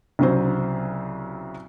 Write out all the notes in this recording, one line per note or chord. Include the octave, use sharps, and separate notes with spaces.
C2 C#3 F#3 C5